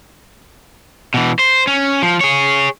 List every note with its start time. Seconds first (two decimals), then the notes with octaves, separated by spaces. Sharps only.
1.14 B2 E3
1.39 C5
1.67 C#4
2.02 F3
2.21 G#4 C#5